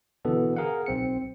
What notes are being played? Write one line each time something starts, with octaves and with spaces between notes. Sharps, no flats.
B2 D3 E3 B3 A4
G#4 A#4 F5 F#5
B1 C4 C#7